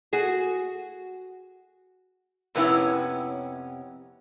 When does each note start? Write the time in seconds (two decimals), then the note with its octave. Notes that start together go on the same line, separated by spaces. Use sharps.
0.13 F#4 G#4
2.55 F2 C3 B3 C#4 E4 C#5